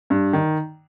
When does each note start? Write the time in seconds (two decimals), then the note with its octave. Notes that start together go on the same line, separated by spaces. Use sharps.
0.10 G2
0.33 D#3